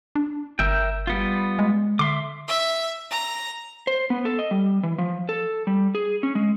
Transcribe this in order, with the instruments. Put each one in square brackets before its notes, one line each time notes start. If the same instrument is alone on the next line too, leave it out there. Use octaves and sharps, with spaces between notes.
[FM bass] D4
[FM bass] G1 [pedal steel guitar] A#4 E5 G5
[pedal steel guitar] G3 B3 F4
[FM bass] G#3
[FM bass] D3 [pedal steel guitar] E5 C6 D6
[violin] E5
A#5
[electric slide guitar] C5
B3
A4
D#5
G3
E3
F3
A4
G3
G#4
C#4
G#3